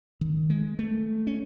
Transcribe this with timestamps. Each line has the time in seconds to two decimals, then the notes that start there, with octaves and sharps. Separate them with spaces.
0.21 D#3
0.50 G#3
0.79 A3
1.27 C#4